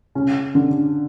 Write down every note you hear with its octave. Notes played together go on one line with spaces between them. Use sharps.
C#3 C#4
D3 D4